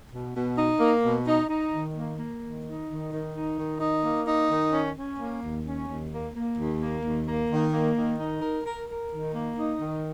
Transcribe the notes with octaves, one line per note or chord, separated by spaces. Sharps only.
B2
B2
D#4
A#3
B2
D#4
D#4
D#3
A#3
A#3
D#3
D#4
D#3
D#3
D#4
D#3
D#4
A#3
D#4
D#3
C#4
C#4
A#3
D#2
C#4
D#2
A#3
A#3
D#2
A#3
D#2
A#3
D#3
A#3
D#3
D#4
A#4
A#4
A#4
D#3
A#3
D#4
D#3